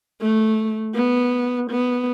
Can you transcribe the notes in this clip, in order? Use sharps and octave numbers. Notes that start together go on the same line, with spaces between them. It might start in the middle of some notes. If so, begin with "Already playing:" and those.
A3
B3
B3